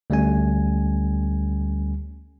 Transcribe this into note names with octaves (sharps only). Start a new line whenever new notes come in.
D2 G3 A3 C#4 G#5